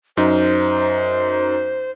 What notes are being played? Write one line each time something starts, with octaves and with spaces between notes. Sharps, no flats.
F#2 D#4 C5